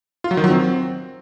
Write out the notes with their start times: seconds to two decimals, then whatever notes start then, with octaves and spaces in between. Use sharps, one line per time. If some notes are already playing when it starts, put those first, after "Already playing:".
0.24 F4
0.31 F#3
0.37 D#3
0.44 F#3
0.50 C4